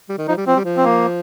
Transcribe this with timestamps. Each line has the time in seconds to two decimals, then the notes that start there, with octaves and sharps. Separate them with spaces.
0.09 G3
0.18 D#3
0.28 F3 D#4
0.37 G3
0.47 F3 C4
0.56 G3
0.65 F3
0.77 C4
0.84 A#3